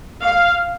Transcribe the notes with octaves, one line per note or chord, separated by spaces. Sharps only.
F5